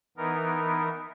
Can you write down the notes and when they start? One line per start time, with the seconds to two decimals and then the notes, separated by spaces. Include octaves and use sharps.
0.17 E3 B3 D#4 A#4